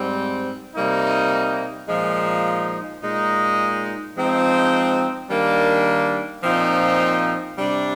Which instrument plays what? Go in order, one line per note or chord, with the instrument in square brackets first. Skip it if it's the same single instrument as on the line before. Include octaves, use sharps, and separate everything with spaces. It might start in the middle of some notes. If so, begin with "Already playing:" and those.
Already playing: [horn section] G#2 G3 C4
C3 G3 A#3 D#4
A#2 F3 G#3 D#4
A#2 G#3 D#4
F3 G#3 C4 D#4
D#3 G3 A#3 D4
A#2 F3 C4 D#4
C3 G3 D4